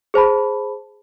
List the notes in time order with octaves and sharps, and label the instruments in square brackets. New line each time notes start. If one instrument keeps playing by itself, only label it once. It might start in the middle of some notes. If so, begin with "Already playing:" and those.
[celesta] G#4 C5 A5 B5